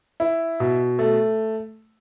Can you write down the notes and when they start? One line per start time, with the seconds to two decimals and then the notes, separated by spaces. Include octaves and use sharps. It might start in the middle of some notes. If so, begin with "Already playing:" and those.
0.20 E4
0.60 B2
0.99 A3